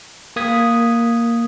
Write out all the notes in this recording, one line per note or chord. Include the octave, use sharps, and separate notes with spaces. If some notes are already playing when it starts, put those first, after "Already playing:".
A#3 D#6 G#6 B6